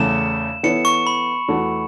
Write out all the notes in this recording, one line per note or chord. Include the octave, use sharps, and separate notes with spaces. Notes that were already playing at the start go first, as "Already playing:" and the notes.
Already playing: E2 C#3 A3 E4 E7
E3 B3 E4 A4 C#5 C#7
C#6
B5
E2 E3 A3 F#4 A4